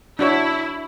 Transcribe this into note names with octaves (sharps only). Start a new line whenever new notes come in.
D4 E4 F#4 C#5